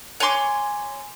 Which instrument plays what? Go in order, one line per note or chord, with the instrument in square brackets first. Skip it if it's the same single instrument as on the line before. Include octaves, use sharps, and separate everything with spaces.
[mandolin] C#5 G#5 C6 D6